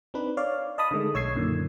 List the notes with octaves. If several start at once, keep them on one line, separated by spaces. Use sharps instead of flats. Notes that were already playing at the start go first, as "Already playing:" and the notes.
C4 D4 D#4 B4
C#5 D5 F5
D#5 A5 B5 D#6
D3 D#3 G#3 A3
B1 C#5 E6 G#6 C7
F#2 A#2 D3 D#3